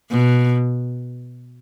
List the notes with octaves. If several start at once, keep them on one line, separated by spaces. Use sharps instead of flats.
B2